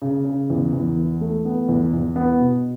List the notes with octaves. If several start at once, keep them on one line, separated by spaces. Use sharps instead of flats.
C#3
C#3
E2
E2
E3
A3
B3
E2
E2
B3
B2